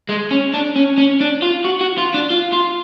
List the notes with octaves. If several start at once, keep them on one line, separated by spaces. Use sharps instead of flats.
G#3
C#4
D4
C#4
C#4
D4
F4
F#4
F#4
F4
D4
F4
F4